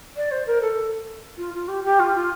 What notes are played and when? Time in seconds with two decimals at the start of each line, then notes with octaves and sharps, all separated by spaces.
0.16 D5
0.31 C5
0.46 A#4
0.61 A4
1.37 F4
1.54 F4
1.68 G4
1.84 G4
1.99 F4
2.14 F4